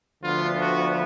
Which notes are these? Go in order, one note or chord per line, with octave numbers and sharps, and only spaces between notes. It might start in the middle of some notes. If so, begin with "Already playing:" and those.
D2 D3 F3 B3 F4
F#4